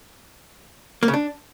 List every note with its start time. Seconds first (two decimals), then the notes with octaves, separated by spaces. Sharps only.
1.03 A#3
1.08 C#3
1.14 D4